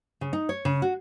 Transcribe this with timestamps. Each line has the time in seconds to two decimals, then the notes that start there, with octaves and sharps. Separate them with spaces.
0.21 C#3
0.33 D#4
0.49 C#5
0.65 C#3
0.82 F#4